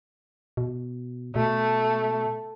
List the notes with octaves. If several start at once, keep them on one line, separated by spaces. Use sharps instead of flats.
B2
B2 A3